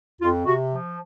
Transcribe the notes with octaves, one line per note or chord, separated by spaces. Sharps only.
F2 F4
C3 F#4
F3